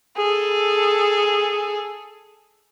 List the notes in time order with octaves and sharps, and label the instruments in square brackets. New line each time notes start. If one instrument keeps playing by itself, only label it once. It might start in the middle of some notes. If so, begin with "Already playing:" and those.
[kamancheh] G#4 A4